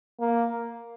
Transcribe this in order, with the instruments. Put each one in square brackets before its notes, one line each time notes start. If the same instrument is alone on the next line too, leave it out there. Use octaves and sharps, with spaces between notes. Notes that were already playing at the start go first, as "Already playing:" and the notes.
[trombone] A#3